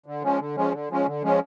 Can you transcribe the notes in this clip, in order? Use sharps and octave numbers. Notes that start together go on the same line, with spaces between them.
D3
F3 G#3 C#4
D3
F3 G#3 C#4
D3
F3 G#3 C#4
D3
F3 G#3 C#4